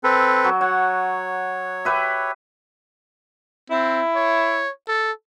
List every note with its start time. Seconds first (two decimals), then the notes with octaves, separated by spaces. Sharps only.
0.04 C4 A4 B4
0.44 F#3
0.61 C#5 F#5
1.85 G4 B4 E5
3.71 C4 E4
4.16 C#5
4.88 A4